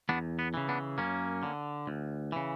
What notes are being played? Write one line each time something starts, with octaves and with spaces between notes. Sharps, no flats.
E2 B3 D4
B3
C#3 E3
B3 D4
F#2 A#3 C#4
D3
D2
C#3 E3